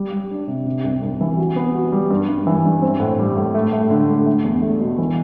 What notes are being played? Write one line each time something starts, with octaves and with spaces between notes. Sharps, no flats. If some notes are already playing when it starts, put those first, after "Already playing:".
Already playing: G3
G3
D4
C3
C3
C2
C2
E3
F#4
B3
F#4
G3
G2
G2
E3
G2
C4
A2
G3
A2
A3
A3
D3
A3
A3
E2
A3
B2
E3